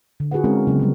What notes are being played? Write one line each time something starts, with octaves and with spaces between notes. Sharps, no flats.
D3
F4 F#4 G#4 A#4 B4 F#5
G#3 C4 C#4 E4 F#4 A#4
C#3 F#3 B3
C#3 F#3 G3